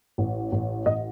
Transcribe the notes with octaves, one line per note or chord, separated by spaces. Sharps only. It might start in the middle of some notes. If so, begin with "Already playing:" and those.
A1
A1
A1 D#5